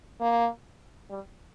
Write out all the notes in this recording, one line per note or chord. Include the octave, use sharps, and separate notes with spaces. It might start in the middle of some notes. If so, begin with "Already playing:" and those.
A#3
G3